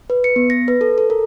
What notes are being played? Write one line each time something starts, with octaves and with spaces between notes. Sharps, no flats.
B4
C#7
B3
A#6
B4
A4
A4
A#4